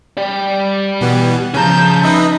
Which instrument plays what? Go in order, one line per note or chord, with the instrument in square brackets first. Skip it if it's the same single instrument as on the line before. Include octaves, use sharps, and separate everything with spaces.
[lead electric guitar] G4 D5
[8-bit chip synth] B2 E3 B3
[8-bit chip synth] C#3 [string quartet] F3 A5 G6 [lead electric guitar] C#4 A#5
[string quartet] D#4 [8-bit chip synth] B4 D#5 E5